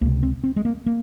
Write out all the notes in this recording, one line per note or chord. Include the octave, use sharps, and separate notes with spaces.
C#2 C3 A#3
C4
C4
G#3
A#3
A#3